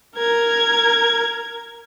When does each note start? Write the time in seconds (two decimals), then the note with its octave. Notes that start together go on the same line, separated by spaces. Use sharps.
0.17 A#4 G#6